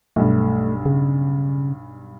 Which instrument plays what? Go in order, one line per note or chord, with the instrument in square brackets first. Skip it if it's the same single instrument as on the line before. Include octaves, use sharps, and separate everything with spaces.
[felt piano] B1 G2 [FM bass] A3
[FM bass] C#3